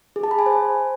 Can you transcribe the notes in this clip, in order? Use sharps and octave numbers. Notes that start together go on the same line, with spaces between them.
G#4
A5
B5
G#5
C5